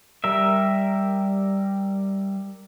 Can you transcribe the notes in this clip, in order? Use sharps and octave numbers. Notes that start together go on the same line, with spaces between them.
G3 A#4 E5